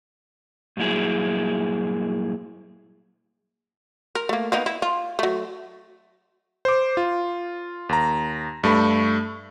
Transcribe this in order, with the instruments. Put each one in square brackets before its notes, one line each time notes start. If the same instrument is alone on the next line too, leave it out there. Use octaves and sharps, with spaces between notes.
[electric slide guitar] G2 A#2 F#3 E4 G#4
[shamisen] A#4
A3 A#3
A#3 B3 D#4
E4
F4
F#3 A3
[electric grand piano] C5 D6
F4
D#2 A#5
G2 A3 B5 C#6